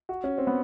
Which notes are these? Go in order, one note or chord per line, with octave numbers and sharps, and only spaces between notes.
F#4
C#4
C4
B3